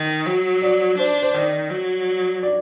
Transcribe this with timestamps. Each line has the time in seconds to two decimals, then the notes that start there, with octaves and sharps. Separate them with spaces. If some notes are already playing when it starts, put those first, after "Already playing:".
Already playing: D#3 D#5
0.26 F#3
0.62 D5
0.98 D4 C5
1.23 C5
1.34 D#3 D5
1.71 F#3
2.43 D5